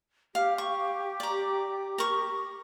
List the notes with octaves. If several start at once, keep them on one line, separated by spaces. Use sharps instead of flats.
G4 F5
C#6
D5 A#5
A#4 C#6